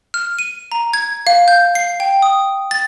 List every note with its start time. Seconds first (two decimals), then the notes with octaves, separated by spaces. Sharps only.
0.14 F6
0.39 D#7
0.72 A#5
0.94 G#6
1.27 F5
1.48 G6
1.75 C7
2.00 G5
2.22 D#6
2.71 A6